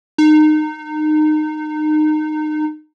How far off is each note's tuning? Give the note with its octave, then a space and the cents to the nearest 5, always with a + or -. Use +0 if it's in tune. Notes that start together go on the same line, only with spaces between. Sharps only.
D#4 -25